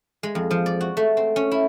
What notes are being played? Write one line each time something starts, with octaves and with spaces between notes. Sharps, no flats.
G#3
F2
F3
D5
F#4
A3
C4
C#4
E4